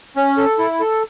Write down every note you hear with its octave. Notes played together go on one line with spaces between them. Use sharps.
C#4
A4
E4
A4